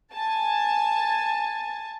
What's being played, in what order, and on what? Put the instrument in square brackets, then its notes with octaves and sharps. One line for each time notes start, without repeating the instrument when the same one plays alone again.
[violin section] G#5 A5